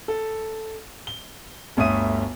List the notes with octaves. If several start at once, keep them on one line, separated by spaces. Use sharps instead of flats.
A4
G7
G1 D2 C#5 E5 D#6 D#7